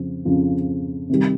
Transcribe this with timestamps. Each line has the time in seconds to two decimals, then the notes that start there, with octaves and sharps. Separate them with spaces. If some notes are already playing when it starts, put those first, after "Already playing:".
Already playing: F2 C#3 F3
0.25 F2 C#3 F3
1.10 C3 D#3 G3